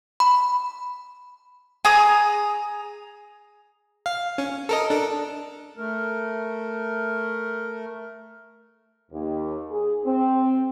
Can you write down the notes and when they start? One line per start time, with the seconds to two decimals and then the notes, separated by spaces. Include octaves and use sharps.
0.20 B5
1.85 G#4 A#5 D#6
4.06 F5
4.38 C#4
4.69 A4 A#4 D#5
4.90 D4 A4
5.77 A3 A#4
9.11 D#2
9.71 G#4
10.05 C4